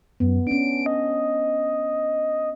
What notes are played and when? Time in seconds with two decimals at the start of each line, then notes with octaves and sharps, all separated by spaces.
0.20 F#2 B3
0.47 C#4 D4 D7
0.86 D#5